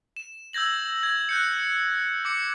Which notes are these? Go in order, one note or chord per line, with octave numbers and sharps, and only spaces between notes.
E7
E6 G6 G#6 A#6 F#7
G#6
F#6 G6 C#7
D6 C#7